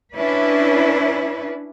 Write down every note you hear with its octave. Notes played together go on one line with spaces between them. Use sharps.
C#4 D4 E4 B4